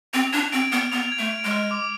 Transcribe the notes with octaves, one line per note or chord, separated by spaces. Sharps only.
C4 F7
D4 G#6
C4 D7
B3 F6
B3 F7
G#6
A3
D7
G#3
F6
D6